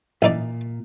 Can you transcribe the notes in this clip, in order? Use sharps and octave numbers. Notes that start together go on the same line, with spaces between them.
A1 A#2 D#4 D5